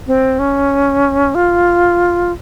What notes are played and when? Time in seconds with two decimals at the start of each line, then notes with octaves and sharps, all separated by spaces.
0.07 C4
0.39 C#4
1.35 F4